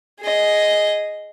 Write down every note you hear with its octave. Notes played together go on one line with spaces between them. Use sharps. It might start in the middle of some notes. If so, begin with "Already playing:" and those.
G#4 D#5